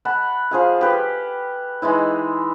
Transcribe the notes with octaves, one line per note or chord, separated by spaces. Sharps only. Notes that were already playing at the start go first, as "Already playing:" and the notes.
F#5 A5 B5
F3 G#4 F5
G4 B4
E3 G#3 D#4 E4